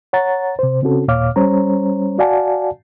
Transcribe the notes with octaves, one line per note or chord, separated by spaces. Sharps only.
C#5 F#5 A#5 A6
C3 C5
C#3 C4 C#4 F#4 A4
D#2 A#2 C#5 F5 D6 F6
G3 C#4 C5 C#5 A#5
F#4 D5 F5 F#5 G#5 A5